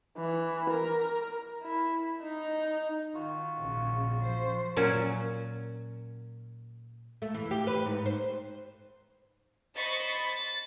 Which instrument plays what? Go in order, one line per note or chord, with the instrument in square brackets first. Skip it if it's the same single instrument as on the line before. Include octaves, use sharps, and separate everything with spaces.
[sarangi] E3
A#4
E4
D#4
[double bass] D#3 [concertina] F4 F#4
[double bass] A#1 A#2 [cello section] C#3
[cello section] F3 C5
[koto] A#2 F#3 C#4
[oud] A3
E3
G4
B4
G#2
C5
[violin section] C5 D#5 B5 C#6 A6 B6
A6